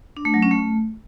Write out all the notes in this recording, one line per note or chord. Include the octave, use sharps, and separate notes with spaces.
D4
A3
F#3
C#4
A3